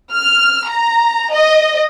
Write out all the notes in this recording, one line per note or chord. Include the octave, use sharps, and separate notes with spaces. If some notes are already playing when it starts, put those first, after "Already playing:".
F6
A#5
D#5